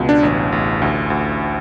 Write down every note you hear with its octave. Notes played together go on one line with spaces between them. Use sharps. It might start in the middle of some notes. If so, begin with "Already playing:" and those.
Already playing: C#2 B2
D4
A1
A1
D2
D2